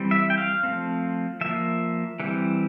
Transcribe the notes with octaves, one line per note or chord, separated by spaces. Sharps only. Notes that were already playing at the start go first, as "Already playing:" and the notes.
Already playing: E3 G3 C4
E5
G5
F5
F3 A3 C4
F3 A#3 E5
E3 G3 C4